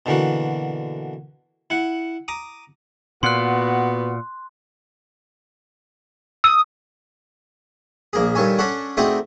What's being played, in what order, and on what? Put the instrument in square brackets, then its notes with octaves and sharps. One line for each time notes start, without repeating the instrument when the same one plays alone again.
[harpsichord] B2 D3 E3 A#3 F#4
E4 F#5
A#5 D6 D#6
[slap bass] A#2 [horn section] B3 F#4 [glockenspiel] C6 F#6
[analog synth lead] D#6 [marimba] E6
[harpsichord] A#1 A#3 G#4
G2 D#3 A4 C#5 G#5
C#4 D4 A4 C#5 F#5
A3 C4 D4 D#4 F#4 G#4